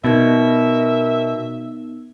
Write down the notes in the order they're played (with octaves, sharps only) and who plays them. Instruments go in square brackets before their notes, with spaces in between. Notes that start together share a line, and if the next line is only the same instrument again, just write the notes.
[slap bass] B2 [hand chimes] B3 D#4 G#6 [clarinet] A#4 [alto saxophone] E5